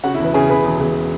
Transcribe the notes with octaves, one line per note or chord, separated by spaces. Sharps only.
C#3 F#4 F#5
E4 E5
E1 B4
C#3 G#4 G#5
C#3 B4 B5
E1
E1